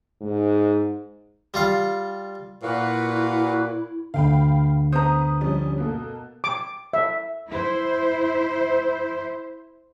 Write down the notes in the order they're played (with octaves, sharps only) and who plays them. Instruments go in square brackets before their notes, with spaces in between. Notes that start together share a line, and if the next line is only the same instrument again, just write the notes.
[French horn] G#2
[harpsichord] G3 F4 F5
[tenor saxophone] A#2 [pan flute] E4 [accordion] F#4 B4 F5
[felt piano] D2 [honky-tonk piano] F5 G5 B5
[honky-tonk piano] B3 D#6 [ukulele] C5 A#5
[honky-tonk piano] F3 G3 C#4
B2 A#3 A4
[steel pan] D6
E5
[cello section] E4 C5